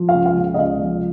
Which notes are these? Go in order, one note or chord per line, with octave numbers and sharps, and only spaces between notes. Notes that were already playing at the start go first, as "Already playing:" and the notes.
Already playing: F3
F5
C#2
F5
C#3
D#5
C#2 F5
F3